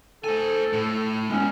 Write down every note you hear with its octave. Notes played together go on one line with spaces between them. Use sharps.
A4 C5 G#5
A2
G#3 B3 C#4